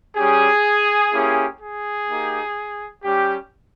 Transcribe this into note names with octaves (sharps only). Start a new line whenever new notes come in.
G3 C#4 G4 G#4
A#3 C#4 E4 G4
G#4
A#3 D#4 G4
G3 C#4 G4